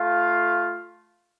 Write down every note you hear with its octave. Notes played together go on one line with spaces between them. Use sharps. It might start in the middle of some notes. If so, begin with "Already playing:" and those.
Already playing: A3 F4 F5